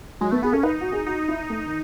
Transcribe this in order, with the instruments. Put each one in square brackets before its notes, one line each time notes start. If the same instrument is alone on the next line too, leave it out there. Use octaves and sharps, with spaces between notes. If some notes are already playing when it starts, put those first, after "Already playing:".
[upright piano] F#3 [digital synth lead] G#3
[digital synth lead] A3 [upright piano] B3
[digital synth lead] B3 [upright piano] G#4
[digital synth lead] C#4 [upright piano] A4
[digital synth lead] D#4 [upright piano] B4
[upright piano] F#4
G#4
[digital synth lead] D#4 [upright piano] F#4
[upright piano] E4
A3
D#3